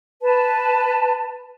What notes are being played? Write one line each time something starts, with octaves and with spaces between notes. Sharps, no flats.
B4 A5